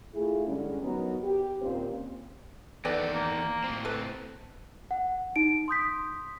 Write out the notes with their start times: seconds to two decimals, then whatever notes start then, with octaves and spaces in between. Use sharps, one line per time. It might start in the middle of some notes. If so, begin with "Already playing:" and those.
0.14 A3 E4 F4 G#4
0.46 D3 G3 G#3 C#4
0.81 F#3 B3 D#4 F#4 A#4
1.24 G4
1.61 D#2 A#2 A#3 C4 C#4 C5
2.85 E2 D#3 A4 B4 D5 G5
3.13 A#3
3.64 A2 C4
3.85 A4 B4
4.91 F#5
5.36 D#4 D7
5.68 C6 D#6 G6 B6